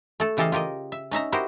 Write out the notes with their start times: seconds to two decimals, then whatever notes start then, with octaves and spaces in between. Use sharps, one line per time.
0.20 A3 A4
0.37 C#3 E3 G4 A4 D#5 F5
0.52 F4 G4 A#4 D#5
0.92 E5
1.11 C#4 D#4 E5 A#5
1.32 E4 F#4 G4 A#4 C5 D#5